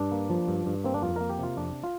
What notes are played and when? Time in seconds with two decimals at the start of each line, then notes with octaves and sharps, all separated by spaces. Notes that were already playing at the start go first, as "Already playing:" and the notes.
Already playing: G2 D4
0.11 A#3
0.30 F3
0.48 G2
0.66 G2
0.84 A#3 C4
0.94 D4
1.02 F2 F4
1.16 A#3 A#4
1.29 G4
1.39 C3 F4
1.57 F2 D4
1.84 F4